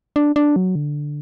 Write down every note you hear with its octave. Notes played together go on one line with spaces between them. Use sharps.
D4
D4
F#3
D3